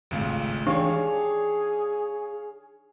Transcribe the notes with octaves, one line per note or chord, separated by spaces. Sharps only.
G#1 C#2 A2
E3 D4 D#4 G4 G#4 C#5 F5